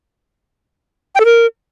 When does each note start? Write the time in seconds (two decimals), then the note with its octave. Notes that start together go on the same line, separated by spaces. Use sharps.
1.15 G5
1.20 A4
1.25 A#4